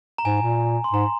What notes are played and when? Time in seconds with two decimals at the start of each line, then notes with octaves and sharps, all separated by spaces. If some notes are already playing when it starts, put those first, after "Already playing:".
0.18 A#5
0.25 G#2 G#5
0.42 A#2
0.84 C6
0.93 G#2 A#5